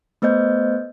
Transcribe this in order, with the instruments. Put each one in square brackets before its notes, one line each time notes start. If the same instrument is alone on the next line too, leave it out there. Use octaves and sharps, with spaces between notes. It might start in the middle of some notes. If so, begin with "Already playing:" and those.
[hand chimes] A3 B3 C5 D#5 G6